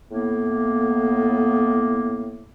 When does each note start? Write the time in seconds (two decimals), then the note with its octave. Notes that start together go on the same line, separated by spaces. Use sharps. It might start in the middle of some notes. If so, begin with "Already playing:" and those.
0.11 A2 A#3 B3